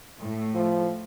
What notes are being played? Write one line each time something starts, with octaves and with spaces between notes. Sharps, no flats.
A2
F3